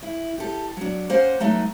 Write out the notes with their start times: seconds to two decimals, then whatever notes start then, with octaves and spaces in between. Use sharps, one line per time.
0.03 E4
0.38 G4 A4
0.77 F#3 D4
1.10 A#3 C#4 C5 F#5
1.40 F#3 A3 B3 D#4